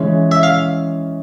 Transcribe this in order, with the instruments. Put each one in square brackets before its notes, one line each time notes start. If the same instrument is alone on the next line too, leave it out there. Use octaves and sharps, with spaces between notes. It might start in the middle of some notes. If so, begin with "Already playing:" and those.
Already playing: [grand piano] E3 G#3 C#4
[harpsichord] E5
F5